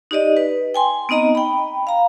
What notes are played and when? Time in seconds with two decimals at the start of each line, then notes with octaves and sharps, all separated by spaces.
0.11 D#4 G4 D5 D#5
0.37 B4
0.74 G5 G#5 C6
1.09 B3 C4 D#4 D#5 A#5
1.35 G5 B5
1.87 F5 A#5